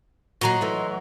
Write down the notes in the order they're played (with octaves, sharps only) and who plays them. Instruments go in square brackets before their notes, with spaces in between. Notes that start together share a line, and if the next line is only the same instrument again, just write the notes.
[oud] A#2 [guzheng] F#3 F#4 [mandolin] D#5 A#5 C6
[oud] E3 A3